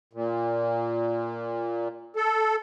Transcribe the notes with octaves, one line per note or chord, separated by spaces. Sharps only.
A#2
A4